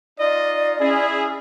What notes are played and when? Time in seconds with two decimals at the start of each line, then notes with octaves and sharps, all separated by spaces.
0.19 D#4 F4 D5 D#5
0.79 C#4 E4 G#4